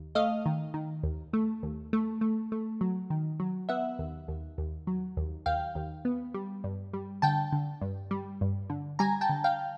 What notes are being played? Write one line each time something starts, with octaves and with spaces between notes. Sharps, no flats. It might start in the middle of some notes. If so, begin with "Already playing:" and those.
Already playing: D#2
A3 D#5 F5
D#3
D#3
D#2
A3
D#2
A3
A3
A3
F#3
D#3
F#3
B3 E5 F#5
D#2
D#2
D#2
F#3
D#2
D#2 F5 G5
D#2
B3
G3
G2
G3
D3 G5 A5
D3
G2
G3
G2
D3
G3 G#5 A#5
G5 A5
D3
F5 G5